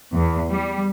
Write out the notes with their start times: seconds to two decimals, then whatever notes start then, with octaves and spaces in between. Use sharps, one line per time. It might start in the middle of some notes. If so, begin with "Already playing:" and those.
0.14 E2
0.50 G3